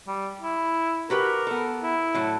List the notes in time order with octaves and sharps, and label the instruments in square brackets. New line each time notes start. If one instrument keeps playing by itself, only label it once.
[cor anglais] G3
E4
[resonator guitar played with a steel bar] F#4 G4 B4 [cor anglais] A#4
[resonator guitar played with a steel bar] B3 A4
[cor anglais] E4
[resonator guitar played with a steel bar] A2 F#3